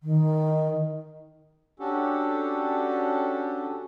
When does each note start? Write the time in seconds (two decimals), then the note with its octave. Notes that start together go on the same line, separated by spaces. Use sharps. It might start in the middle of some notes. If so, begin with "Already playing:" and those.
0.02 D#3
1.80 C#4 D4 F#4 G4 A4